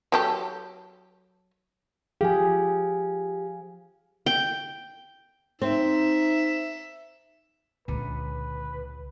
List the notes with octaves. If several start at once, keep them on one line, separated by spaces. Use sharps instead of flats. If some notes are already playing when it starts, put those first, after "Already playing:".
F#3 G4 A4
F3 G4 G#4 F5 G#5
G5
C4 D#4 E5
C#2 A#2 D3 B4